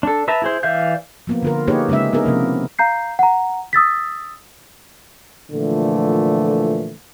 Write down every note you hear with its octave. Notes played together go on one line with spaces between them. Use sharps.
D4 A4
B4 E5 A5 A#5
E4 G#4 C5
E3 D5 E5 F5 G6
F3 A#3 B3
D3 F4 A#4
A#3 D#4 G4 G#4 B4 C#5
C#3 G#3 A#3 C#4 E5
B3 D4 D#4 G#4 A#4
C3 F3 A#3
F5 A#5 G6 C7
F#5 A#5
D#6 E6 A6 B6
A#2 D3 E3 F3 A3